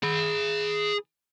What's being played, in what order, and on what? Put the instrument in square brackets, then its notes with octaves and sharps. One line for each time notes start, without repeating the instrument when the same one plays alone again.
[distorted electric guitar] G#4 B5